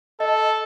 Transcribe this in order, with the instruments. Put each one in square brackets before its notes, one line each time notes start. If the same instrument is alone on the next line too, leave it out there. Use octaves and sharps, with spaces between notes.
[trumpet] A4 [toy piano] D#5